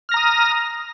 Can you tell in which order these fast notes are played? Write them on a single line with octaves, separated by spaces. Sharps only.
F6 A#6 A#5 D#6